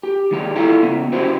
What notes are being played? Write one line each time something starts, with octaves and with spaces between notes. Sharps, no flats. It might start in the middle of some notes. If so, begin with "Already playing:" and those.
G4
D#3 G#3 G4
E4 F4 A4 E5 F5 A#5
C#3 B3
C#4 E4 F#4 G4 B4 C5